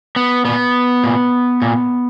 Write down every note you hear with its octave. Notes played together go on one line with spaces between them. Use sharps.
B3
A#2 B3
A#2
A#2